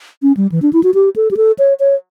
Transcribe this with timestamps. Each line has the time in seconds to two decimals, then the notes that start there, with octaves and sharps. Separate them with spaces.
0.22 C#4
0.37 G3
0.52 E3
0.62 D4
0.73 E4
0.83 F#4
0.94 G4
1.16 A4
1.31 G4
1.37 A4
1.59 C#5
1.80 C#5